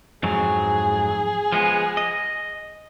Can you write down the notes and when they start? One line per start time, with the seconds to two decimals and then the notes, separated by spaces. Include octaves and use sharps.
0.23 F2 G#2 F#3 G#4
1.52 F3 G#3 B3
1.97 D#5